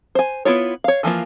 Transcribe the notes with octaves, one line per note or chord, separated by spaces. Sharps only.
C5 G#5
B3 E4 F4 C#5
C#5 F5
E3 F3 A#3 F4